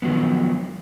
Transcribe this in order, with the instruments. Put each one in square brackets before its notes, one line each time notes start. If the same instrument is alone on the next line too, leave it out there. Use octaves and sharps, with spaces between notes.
[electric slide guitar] D#3 F3 F#3 G#3 B3